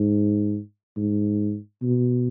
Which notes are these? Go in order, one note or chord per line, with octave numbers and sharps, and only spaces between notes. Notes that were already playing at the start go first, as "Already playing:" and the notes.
Already playing: G#2
G#2
B2